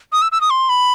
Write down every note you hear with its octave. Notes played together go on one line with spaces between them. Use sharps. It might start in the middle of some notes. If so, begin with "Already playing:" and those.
D#6
E6
E6
D#6
C6
B5